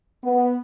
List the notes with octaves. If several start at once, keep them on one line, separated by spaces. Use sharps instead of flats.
B3